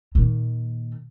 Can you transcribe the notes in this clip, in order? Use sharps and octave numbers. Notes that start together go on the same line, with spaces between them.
A#2 D#3